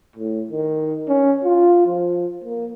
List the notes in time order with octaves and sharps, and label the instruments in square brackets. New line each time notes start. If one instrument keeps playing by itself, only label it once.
[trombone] A2
D#3
C#4
F4
F3
A#3